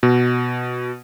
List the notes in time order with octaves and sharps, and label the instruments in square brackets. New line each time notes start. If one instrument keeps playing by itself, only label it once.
[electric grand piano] B2